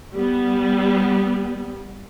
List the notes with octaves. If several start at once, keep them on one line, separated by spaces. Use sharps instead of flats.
G3 B3